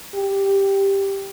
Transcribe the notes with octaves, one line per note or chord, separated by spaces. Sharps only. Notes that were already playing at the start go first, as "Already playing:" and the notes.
G4